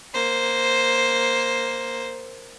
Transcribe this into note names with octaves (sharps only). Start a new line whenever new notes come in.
A#3 C5